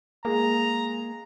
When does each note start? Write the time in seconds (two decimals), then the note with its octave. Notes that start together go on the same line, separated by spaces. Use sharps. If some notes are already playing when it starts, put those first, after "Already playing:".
0.25 G#3 A#3 G#4 A#5